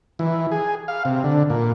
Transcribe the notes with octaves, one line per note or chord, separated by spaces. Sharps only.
E3
G#4
F5
C3
D3
A#2